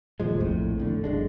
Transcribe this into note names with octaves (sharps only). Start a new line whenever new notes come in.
D#1 A#2 F3 G#3
A#1 F2 A2
E2 A2 D3
F#1 G#3 D4